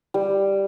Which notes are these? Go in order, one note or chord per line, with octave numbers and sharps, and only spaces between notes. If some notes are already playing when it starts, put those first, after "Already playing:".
G3